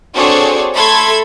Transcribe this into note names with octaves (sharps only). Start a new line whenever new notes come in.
C4 D4 F#4 G#4 A4 C#5
A3 A4 B5 C6 G#6